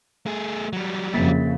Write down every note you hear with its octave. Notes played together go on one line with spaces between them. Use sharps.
A3 G#4
F#3 G3
F2 C#3 F3 A#3 A6 B6